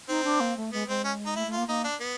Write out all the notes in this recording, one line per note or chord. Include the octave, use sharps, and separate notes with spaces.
C4 D#4
D4
A#3
A3
G#3 B3
G#3 C4
C#4
D#4
A3 E4
A3
F4
A#3
A#3 D#4
D4
B3